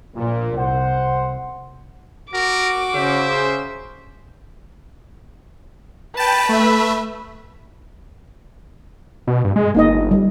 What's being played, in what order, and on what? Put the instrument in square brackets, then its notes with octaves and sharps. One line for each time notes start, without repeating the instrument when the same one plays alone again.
[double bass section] A#1 [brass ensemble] A#2
[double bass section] C2 [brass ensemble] C5 F#5
[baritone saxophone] F#4 [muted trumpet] A#4 [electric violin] D6
[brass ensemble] C#3 C5 [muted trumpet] E5
[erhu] B4 [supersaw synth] G5 A5
[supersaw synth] A3 E5
[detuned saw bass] B2
G2
G#3
[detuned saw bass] G1 [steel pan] A#3 D#4 D#5
[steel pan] G3